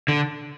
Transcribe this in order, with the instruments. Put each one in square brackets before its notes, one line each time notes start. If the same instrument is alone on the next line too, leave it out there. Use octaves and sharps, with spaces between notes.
[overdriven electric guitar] D3